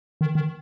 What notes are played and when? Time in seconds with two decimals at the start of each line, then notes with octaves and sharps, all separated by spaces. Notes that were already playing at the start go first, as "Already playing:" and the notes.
0.21 D#3
0.35 D#3